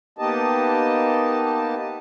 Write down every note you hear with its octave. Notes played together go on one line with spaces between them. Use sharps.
A#3 B3 D#4 G4 D#5 A5